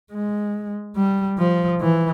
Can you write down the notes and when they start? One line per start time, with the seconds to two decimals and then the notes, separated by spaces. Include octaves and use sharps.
0.11 G#3
0.96 G3
1.38 F3
1.80 E3